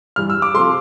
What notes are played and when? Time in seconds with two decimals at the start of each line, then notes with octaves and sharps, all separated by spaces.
0.16 G2 E3 G3 F6
0.30 E6
0.42 D6
0.54 C3 F3 A3 C6